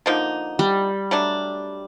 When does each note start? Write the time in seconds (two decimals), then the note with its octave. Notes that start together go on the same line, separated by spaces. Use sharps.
0.06 D3 F3 A#3 D#4
0.59 G3
1.11 F#3 A3 D4